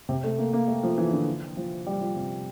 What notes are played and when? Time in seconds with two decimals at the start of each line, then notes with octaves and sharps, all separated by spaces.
0.09 C3
0.24 A3
0.39 A#3
0.53 A#3
0.68 A3
0.83 F3
0.98 E3
1.13 D3
1.57 F3
1.87 G3
2.01 F3
2.16 C3